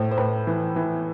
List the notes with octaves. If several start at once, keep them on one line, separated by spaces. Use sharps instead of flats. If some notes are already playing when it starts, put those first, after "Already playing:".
Already playing: A2 C5
C5
A2 B4
E3
E3